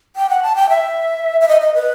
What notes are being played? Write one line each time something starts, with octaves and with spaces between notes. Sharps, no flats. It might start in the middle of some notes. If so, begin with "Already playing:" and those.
G5
F#5
A5
G5
E5
E5
D#5
D#5
B4